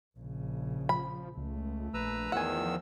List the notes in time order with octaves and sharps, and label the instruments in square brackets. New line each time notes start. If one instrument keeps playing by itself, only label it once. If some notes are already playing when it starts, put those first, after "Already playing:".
[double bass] A#1 C#3
[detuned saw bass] F3 [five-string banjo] B5
[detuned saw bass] C#2 [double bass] A3
[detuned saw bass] A#1 [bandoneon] B4 A#5 E6
[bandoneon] E2 D#3 E6 [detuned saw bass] F3 [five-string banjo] F#5 G#5